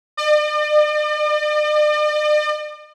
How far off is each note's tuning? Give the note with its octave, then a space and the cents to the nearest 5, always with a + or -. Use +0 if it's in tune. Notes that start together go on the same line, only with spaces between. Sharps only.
D5 +45